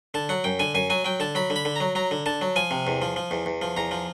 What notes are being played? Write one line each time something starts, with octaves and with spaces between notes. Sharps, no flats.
D3 A5
F#3 F#5
F#2 G5
D3 G#5
F#2 G#5
F#3 G#5
F#3 G5
D3 A5
F#3 B5
D3
B5
D3
F#3 A#5
F#3 A#5
D3
D3 A5
F#3
F3 G#5
C3
E2
F3
F3
E2
E2
F3
E2 A#5
F3